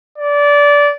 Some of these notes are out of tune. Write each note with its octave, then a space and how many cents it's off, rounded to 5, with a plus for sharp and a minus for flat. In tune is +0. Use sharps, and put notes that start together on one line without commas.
D5 -20